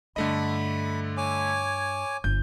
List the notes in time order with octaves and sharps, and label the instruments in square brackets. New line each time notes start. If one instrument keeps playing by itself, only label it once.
[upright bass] G2 [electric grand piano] D3 A3 D#5 [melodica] B5
[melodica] C#5 G#5 D6
[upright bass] G1 [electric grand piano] G6